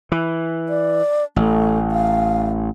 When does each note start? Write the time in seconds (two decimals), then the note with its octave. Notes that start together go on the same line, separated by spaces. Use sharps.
0.12 E3
0.69 D5
1.36 A1 A3
1.92 F5